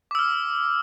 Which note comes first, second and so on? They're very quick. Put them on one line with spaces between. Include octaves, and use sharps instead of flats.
D6 E6 F6